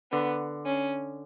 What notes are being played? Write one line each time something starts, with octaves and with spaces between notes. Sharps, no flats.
D3 B3
C#4